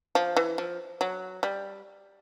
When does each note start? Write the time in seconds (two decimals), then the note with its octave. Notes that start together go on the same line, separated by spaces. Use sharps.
0.15 F3
0.37 E3
0.58 F3
1.01 F#3
1.43 G3